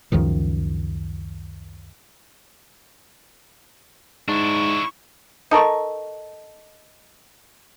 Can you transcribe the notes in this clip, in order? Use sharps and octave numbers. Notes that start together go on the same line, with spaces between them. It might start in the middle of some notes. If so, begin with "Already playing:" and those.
C#2 F#2 D#3 F3
G#2 D4 E4 C#6
D#4 A4 A#4 C#6